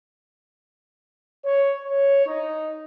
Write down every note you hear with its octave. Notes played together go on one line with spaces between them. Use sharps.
C#5
C#5
D#4